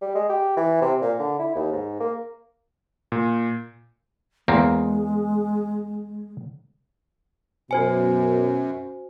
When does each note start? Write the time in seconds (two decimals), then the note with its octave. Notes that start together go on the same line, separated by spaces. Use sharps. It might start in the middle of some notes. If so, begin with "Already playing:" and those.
0.01 G3
0.15 G#3
0.29 G4
0.56 E3
0.81 C3
1.01 A#2
1.19 D3
1.39 E4
1.55 D#2
1.72 G#2
2.00 A#3
3.12 A#2
4.48 E2 G#3 A#3 C4
7.71 F#2 B2 F#4 C5 G#5